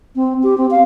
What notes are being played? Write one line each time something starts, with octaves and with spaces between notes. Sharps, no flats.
C4
G4
C4
F5